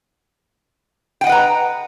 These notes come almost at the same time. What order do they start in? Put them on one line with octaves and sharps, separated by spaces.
G5 F#5 D#5 B4 A#5